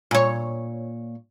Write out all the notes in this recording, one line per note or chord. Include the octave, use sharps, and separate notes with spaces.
A#2 C#5